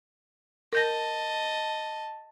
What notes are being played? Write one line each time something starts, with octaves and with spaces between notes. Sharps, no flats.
A#4 D#5 A5 G6 A#6